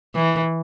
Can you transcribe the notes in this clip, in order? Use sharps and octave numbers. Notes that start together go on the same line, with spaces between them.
E3